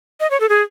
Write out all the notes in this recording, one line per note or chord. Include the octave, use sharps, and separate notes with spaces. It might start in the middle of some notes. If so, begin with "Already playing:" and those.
D#5
C#5
A4
G#4